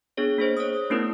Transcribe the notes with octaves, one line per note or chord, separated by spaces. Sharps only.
B3 D4 G#4 C#5
A#3 G#4 C5
C#5 D#6
A3 B3 C#4 E4 A#4